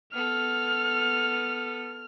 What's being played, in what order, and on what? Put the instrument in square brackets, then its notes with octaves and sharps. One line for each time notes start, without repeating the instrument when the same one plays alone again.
[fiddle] B3 A4 [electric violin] F6